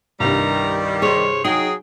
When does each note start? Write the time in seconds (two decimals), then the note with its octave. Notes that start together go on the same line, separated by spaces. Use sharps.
0.20 C2 G2 D#3 G3 A#5
1.02 G#4 C5 C#5
1.45 F#3 D#4 G#4 G5